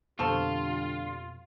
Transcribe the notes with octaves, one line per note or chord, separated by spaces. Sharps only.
F2 B2 D3 G3 C4 F4 A4 C#6